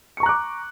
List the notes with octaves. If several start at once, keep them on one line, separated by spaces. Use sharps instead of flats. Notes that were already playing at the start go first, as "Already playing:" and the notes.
A#5 C#6 D6 F#6 C#7